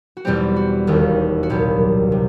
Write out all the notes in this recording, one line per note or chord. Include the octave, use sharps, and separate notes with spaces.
F#4
E2 B2 G3 C4 G4
F#4
E1 D#2 D#3 G3
F#4
C2 A#2 F#3 B3 G4
C3